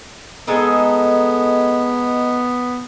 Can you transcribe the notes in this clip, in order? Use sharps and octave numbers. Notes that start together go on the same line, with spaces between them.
G#3 B3 D#4 A4